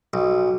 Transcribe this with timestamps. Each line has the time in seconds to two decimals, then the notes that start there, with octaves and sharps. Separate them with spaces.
0.14 B1